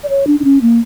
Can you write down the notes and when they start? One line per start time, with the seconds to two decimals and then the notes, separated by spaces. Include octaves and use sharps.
0.03 D5
0.09 C#5
0.27 D4
0.40 D4
0.44 C#4
0.62 A#3